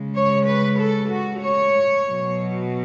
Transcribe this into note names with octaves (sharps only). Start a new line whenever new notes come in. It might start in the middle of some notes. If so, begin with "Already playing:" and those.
Already playing: C#3 G#3
C#5
B4
A4
F#4
C#5
B2 F#3